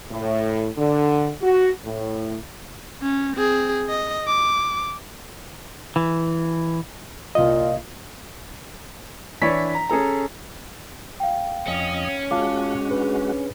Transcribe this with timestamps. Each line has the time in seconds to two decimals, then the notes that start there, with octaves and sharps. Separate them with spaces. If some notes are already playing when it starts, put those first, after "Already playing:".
0.11 A2
0.78 D3
1.42 F#4
1.85 A2
3.02 C#4
3.36 C4 G#4
3.90 D#5
4.27 D6
5.96 E3
7.35 C2 A#2 F4 D#5
9.42 E3 D4 E4 C#5 B5 B6
9.75 A#5
9.90 C#4 G#4 A4 A#5
11.20 F5 G5
11.68 F2 C#4 D#5
12.31 G#3 F4 F#4 F5 A5 D6
12.89 D4 G#4 B4